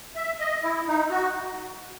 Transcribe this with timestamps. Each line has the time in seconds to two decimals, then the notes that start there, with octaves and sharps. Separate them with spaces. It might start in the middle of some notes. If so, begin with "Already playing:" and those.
0.16 E5
0.40 D#5
0.63 E4
0.87 D#4
1.11 F#4